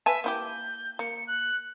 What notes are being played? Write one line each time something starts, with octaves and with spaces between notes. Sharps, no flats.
B4 E5 G#5 A5
A#3 E4 G4 G6
A#3 C#7
F#6